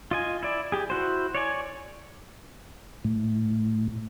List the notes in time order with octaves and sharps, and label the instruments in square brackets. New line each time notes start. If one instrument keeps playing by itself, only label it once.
[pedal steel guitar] F4 D#5 G#5
E4 D5
G4 G#4
E4 F#4 C5
C#5 D5 G#5
[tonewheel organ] A2